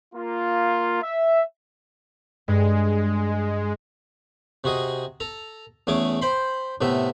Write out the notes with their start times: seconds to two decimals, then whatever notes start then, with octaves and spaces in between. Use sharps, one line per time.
0.14 A#3 F4
1.03 E5
2.48 G2 G#3
4.64 C3 F#4 G#4 D#5
5.20 A4 A#5
5.87 E2 A3 C#4 G#4 D6
6.22 C5 G5 B5 C6
6.81 A2 C3 A3 B3 E5